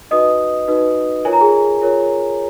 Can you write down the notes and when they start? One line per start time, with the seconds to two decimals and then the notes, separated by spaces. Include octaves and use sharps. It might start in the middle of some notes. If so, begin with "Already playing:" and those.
0.11 D#4 F#4 B4 D#5 D#6
0.68 D#4 F#4 B4
1.25 F4 A#4 C#5 G#5
1.33 A#5
1.41 G#4 G#5
1.82 F4 A#4 C#5